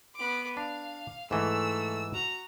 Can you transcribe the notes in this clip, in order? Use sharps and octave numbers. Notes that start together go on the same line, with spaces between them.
B3 D6
D4 F5
G#2 E3 A3 E6
F#4 A#5